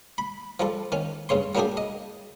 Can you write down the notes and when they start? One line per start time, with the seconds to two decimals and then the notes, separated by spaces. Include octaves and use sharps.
0.18 B5
0.60 F3 G3 A4
0.92 D#3 C#4
1.29 G2 C#3 C#5 C6
1.55 F#3 G3 A#3 D4 G4 G#4
1.77 D#5